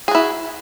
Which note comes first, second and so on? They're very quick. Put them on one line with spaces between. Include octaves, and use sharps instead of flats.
G#4 F#4 E4